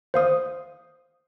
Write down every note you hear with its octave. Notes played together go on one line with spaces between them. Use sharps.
C5 F5 D#6